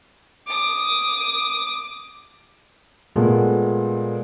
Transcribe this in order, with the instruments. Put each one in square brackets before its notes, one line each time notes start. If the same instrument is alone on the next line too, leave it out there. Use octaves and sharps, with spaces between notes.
[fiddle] D6 D#6
[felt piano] A#2 G#3 A3 B3